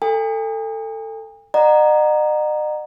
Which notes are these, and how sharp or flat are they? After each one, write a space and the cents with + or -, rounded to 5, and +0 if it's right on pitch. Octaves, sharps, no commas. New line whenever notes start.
A4 +20 G#5 -45
D#5 -45 F#5 +0 A#5 +0